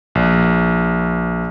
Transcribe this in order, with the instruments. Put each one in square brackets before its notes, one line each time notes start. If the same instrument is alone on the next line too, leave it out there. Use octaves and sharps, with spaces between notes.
[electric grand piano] A#1